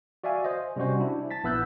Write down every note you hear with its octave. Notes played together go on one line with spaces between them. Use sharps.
F#4 D5 E5 F5 G#5
C5 D#5
C3 G3 C#4 F#4 C5
D4 E4
A5 A6 B6
A#1 B3 E4 E6 F#6 G6